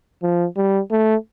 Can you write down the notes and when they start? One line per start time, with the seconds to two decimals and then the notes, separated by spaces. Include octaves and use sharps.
0.23 F3
0.57 G3
0.91 A3